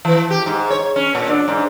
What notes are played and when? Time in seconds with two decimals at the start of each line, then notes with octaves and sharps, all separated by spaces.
0.05 E3
0.30 G4
0.46 G#2
0.70 C#5
0.96 C#4
1.15 A#2
1.29 D4
1.48 G#2